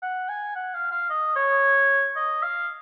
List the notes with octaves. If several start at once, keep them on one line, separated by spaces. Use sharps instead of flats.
F#5
G#5
F#5
F5
F5
D#5
C#5
D#5
F5